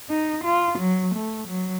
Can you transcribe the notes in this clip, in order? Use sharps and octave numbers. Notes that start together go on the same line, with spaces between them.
D#4
F4
F#3
A3
F#3